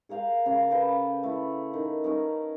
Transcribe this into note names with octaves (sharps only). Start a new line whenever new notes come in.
G#4 A#4 F5 G5
C#3 F5
A4 B4 G5 A5
A3 E4
D#3
C#4 D#4 A#4